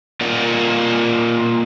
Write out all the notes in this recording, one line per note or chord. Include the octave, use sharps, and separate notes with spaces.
A#3 F4 A#4 D5 D#5 F#5